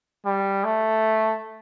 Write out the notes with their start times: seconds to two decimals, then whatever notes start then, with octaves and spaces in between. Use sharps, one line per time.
0.25 G3
0.64 A3